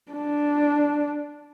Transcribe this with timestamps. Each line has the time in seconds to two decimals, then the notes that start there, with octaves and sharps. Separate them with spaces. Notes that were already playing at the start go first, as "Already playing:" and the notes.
0.12 D4